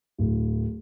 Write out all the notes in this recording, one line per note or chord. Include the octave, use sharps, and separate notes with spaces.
D1